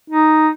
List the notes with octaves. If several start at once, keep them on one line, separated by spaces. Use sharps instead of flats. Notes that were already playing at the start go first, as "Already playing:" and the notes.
D#4